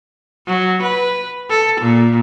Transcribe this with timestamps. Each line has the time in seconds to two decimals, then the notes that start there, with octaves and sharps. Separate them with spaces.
0.47 F#3
0.83 B4
1.49 A4
1.81 A#2